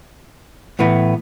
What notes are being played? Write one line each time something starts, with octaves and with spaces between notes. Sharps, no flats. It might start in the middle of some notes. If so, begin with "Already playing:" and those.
A2 E3 B3